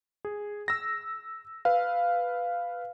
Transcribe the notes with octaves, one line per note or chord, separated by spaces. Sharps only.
G#4
E6 A#6
B4 F5